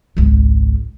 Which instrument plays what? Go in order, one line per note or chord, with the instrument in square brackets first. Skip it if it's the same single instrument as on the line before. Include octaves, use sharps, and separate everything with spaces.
[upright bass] G#1 C#2